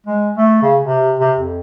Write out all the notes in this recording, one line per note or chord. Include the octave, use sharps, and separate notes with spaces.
G#3
A3
C#3
C3
C3
F2